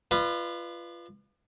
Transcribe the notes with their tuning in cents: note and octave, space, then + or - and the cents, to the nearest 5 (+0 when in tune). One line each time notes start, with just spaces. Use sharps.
F4 -20 B4 +0 D5 +45